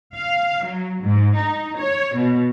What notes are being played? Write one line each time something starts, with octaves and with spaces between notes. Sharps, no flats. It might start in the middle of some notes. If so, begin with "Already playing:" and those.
F5
F#3
G#2
D#4
C#5
B2